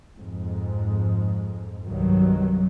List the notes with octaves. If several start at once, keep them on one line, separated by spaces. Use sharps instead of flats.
F2 G#2
C2 G2 D#3 F#3